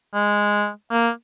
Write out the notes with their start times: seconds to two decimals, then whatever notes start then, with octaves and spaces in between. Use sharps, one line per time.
0.14 G#3
0.91 A#3